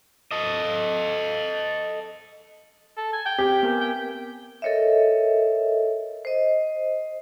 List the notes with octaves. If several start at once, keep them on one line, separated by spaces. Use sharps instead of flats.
A4 D#5
A4
G#5
G5
C4 G4
B3 A#4 G#5
G5
A4 A#4 C#5 D#5 E5
C5 D#5